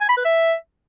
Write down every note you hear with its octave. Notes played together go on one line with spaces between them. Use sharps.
G#5
B5
B4
E5